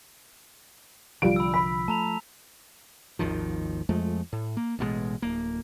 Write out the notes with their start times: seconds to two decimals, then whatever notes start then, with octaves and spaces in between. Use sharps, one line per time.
1.22 C2 D3 F3 G3 F4 D7
1.36 B5 E6
1.54 B5 B6
1.88 A3 A5 A#5 F7
3.19 G#1 D#2 D#3 F3
3.89 F2 F3 G#3 A3
4.33 A2
4.57 A#3
4.79 A1 B2 E3 G#3
5.22 D1 A#3